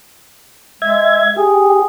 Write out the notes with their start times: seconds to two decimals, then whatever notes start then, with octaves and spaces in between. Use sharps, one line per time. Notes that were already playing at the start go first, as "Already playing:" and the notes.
0.82 G#3 E5 G#6
1.36 G4 G#4